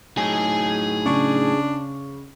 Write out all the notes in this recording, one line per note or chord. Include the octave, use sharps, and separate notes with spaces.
A2 F#3 D#4 G#4 G#5
C#3 D4 C#6